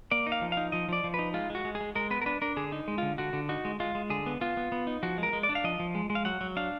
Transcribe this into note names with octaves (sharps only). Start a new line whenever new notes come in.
A#3 D5
D#4
F5
F3
F5
D#4
F3 D#5
F3 D5
F3
D#4 B4
G#3 F4
G#3 F#4
G#3
G#4
G#3
G#3 A#4
B3 B4
A#4
D4 B4
D4 A#4
D3 G#4
D#4
G#3
D3 F4
D3 F#4
D3
D#4 F#4
G#3
G#3 F4
G#3
D3 G#4
B3
B3 F4
B3
B3
D#4
F3 F#4
G#3
A#4
G#3
D5
D4
F5
F3 D#5
F3
G#3
G#3
F5
F#3 F#5
F#3
D4 F5